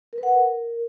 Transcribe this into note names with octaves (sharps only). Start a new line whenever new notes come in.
A#4
B4
F#5
A#4